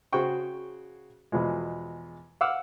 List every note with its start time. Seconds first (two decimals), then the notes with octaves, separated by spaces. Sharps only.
0.13 C#3 F#4 G#4 C5 G5 C#6
1.32 E2 B2 F3 G#3
2.41 F5 F#5 D6 E6 F6